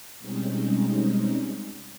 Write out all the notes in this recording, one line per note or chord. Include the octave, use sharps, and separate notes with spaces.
B2 G3 G#3 C4 C#4 D#4